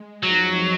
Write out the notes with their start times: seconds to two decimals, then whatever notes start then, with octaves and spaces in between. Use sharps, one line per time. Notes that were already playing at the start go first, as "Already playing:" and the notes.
Already playing: G#3
0.23 F2 F3 F#3 G#3 D#4